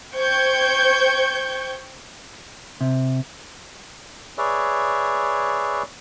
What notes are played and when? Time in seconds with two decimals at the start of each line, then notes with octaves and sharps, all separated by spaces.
0.14 C5 G5 C#6 G6 G#6
2.81 C3
4.38 G#4 B4 C#5 D5 E5